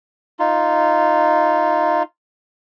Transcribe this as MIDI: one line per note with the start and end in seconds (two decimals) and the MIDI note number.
0.39 2.03 63
0.39 2.03 65